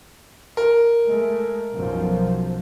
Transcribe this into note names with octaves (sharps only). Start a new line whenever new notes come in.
A#4
G#3 A3
B1 F#2 F3